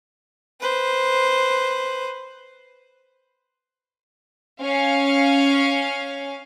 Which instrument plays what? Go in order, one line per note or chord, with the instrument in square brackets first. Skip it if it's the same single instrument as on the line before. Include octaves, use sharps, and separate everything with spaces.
[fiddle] B4 C5
[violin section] C#4 F5